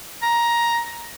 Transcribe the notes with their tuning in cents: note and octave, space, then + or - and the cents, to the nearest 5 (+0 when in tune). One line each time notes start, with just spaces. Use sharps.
A#5 +10